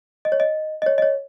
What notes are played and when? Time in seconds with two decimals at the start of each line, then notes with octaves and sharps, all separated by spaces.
0.25 D#5
0.32 C#5
0.40 D#5
0.82 D#5
0.86 C#5
0.98 D#5
1.02 C#5